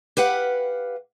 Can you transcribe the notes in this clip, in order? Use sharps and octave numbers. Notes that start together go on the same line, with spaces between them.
G4 B4 F5 F#5